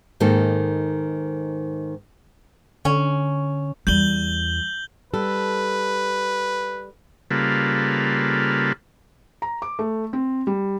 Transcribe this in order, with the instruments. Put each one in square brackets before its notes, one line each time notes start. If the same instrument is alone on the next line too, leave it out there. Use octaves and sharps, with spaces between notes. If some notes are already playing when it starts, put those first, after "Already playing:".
[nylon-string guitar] G#2 D#3 A#3 A4
[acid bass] D3 [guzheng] C#4
[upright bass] E2 G3 [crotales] G6 F#7 G7
[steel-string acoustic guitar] G3 A4 [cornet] B4
[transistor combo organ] C#3 G3 A#3 F4 A4 B4
[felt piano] A#5
D6
A3
C4
G3